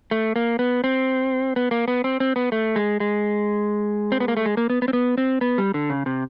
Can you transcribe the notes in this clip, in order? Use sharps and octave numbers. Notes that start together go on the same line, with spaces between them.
A3
A#3
B3
C4
B3
A#3
B3
C4
C4
B3
A3
G#3
G#3
C4
B3
A#3
A3
G#3
A#3
B3
B3
C4
B3
C4
B3
G3
D3
C#3
C3